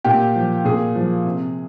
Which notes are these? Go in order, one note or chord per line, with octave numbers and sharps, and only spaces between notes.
A#2 G4
F3
A#2 G#4
F3
C3